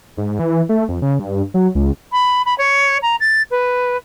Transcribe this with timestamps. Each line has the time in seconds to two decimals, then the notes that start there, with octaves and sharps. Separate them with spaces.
0.17 G#2
0.39 E3
0.69 A3
0.89 F2
1.02 C#3
1.19 G2
1.54 F#3
1.75 C#2
2.12 B5
2.45 B5
2.58 C#5
3.02 A#5
3.20 A6
3.51 B4